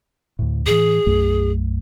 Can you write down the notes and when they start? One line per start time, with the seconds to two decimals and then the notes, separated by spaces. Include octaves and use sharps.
0.39 D2 A2
0.66 A2 E3 G#4
1.06 B1 F#2 A3